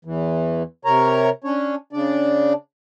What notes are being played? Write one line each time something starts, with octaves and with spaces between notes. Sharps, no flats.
E2 E3
C3 A#4 C#5 A#5
C#4 D4 C#5
C#3 D4 D5